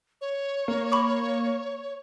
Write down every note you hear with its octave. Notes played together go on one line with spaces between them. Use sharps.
C#5
A#3
B5 C#6 D6